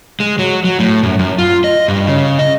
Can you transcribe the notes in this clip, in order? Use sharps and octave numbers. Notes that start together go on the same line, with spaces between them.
G#3
F#3
F#3
A2
F#2
F#2
F4
D#5
G2
C#3
D#5